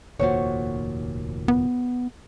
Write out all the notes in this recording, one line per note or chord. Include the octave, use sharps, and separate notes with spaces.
F1 D#2 A#2 F#4 C5 C#5
B3